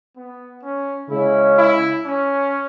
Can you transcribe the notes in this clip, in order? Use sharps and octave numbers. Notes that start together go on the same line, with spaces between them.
B3
C#4
C#3 G#3 C#4 E4
E4
C#4